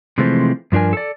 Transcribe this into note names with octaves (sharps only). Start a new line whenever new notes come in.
C3 E3 F3 G#3 A3 C4
G2 F3 D4 A#4 G#5
A4 D5